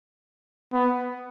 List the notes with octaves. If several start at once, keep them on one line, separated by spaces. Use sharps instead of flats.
B3